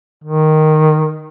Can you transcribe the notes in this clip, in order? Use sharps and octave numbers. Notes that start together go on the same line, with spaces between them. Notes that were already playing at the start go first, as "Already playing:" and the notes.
D#3